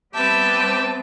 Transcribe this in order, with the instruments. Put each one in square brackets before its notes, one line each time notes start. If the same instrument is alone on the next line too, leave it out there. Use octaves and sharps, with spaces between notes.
[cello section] G3 B3 C4 [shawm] G4 [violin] B4 E5 [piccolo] A5